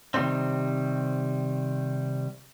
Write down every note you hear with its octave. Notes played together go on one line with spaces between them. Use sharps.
C3 D#3 F#3 G3 A3 C4